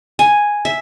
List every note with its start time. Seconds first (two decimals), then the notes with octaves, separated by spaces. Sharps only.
0.19 G#5
0.65 E5